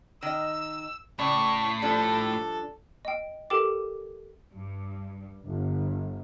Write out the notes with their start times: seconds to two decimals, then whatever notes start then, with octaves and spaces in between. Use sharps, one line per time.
0.23 D#3 D#5 E6
1.19 A2 C#3 D5 C#6
1.82 F3 G3 D4 A4
3.05 D#5 G5
3.50 G4 A4 A#4 G5 D6
4.52 G2
5.45 G1